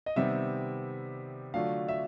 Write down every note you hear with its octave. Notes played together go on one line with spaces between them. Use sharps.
D#5
C3 D#3 G3 B3 E5
D3 F#3 A3 D4 F4 F5
E5